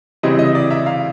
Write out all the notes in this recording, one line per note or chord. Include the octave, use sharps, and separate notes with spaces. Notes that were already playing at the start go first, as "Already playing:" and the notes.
C#3 E3 G3 C4 E4 D#5
D#5
D5
E5
F5